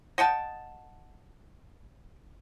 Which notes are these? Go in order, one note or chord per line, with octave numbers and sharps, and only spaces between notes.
D#5 F#5 G5 A5